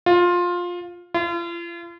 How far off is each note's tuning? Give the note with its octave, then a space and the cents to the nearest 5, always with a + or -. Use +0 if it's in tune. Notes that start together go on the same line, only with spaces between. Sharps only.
F4 +15
F4 -40